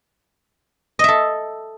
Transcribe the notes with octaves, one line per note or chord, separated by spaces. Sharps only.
A4 D#5 E5